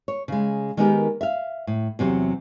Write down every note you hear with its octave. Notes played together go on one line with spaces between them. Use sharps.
C#5
C#3 G#3
D#3 G#3 B3 D#4 G4 A#4
E5 F5
A2
E2 C3 F#3